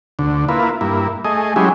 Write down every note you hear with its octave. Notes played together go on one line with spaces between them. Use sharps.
D2 D3
A#3 E4 F4 B4
G2 A#3 E4
A3 G#4 D#5
F#3 G#3 C#4 E4 G4 G#4